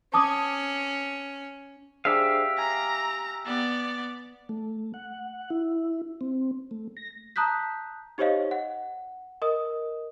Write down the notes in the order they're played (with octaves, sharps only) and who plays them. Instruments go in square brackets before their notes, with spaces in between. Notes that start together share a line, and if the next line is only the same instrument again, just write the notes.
[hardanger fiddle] C#4 [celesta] A5 D6 D#6
[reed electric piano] D4 G#4 C5 [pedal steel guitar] G4 E5 F5
[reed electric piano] G#5 [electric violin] A#5
[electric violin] B3 D5
[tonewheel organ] A3
F#5
E4
C4
A3
A#6
[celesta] A5 A#5 D#6 F#6 G6 B6
D#4 G4 C5 C#5 D#5 F5
F#5
A#4 D#5 D#6